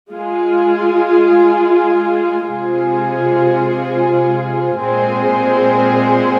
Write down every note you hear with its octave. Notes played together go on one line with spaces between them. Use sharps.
G#3 F4 G#4
C3 G#3 F4 G#4 C5
A#2 G#3 C4 G#4 C5